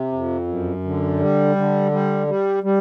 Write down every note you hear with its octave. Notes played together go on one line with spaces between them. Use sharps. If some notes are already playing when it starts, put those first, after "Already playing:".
Already playing: C3
F2
F#2
D3
G3
D3
G3
G3
G3